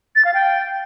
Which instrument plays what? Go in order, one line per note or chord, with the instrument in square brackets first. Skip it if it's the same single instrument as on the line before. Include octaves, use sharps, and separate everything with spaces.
[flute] A6
F5
G5